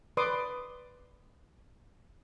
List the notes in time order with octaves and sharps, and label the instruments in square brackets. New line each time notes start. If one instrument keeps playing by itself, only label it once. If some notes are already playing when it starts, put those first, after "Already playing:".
[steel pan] B4 D5 C6 D6 D#6